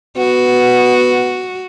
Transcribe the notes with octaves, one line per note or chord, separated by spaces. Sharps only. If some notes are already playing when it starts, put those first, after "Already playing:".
B3 F#4